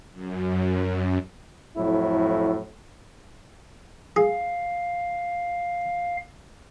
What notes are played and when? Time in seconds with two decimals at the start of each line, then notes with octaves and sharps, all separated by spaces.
0.13 F#2
1.76 F2 A2 F#3 E4
4.16 G#4 F5